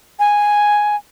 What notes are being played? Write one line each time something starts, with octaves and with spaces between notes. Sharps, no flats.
G#5